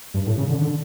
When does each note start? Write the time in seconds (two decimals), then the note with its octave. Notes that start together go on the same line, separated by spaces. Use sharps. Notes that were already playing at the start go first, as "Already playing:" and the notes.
0.14 G2
0.27 A2
0.37 C#3
0.49 D3
0.61 D3